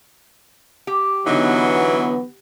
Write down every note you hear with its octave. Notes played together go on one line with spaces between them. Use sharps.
G4
D3 E3 F#3 B3 D#4